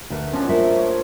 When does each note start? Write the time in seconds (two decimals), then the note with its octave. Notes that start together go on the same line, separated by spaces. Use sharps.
0.10 D2 A3 A#4 B4
0.33 F3 F#3 C#4 D4
0.49 A3 A#3 E5
0.77 C#5